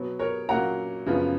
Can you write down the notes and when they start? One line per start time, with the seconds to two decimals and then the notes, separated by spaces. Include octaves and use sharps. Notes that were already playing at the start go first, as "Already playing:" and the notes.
Already playing: B2 F#3 B3
0.19 A#4 C#5
0.49 A#2 F#3 A#3 C#4 F#5 A#5
1.06 F#2 C#3 F3 B3